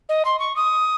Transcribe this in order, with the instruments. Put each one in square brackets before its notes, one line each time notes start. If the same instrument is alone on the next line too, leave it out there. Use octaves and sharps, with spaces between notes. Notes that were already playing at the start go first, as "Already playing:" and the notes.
[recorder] D#5
C6
C#6
D#6